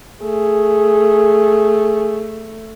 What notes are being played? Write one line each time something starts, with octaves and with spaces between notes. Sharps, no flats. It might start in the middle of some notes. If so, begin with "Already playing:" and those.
A3 G#4